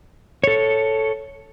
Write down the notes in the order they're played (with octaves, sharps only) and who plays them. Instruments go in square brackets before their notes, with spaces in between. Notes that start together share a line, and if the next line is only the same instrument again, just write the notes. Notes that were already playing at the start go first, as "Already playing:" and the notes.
[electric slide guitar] A4 C#5